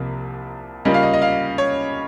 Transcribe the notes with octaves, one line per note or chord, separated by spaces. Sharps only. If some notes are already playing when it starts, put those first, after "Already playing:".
Already playing: C2 C3 F3 A#3
C#3 G3 A#3 C#4 F4 D#5
F5
D#5
D#5
F5
C#5